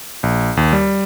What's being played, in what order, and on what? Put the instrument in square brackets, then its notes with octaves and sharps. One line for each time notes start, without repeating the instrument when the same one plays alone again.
[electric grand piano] A#1
D#2
G3